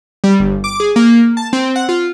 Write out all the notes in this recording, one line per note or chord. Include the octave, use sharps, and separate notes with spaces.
G3
G1
D6
G#4
A#3
A5
C4
F#5
F4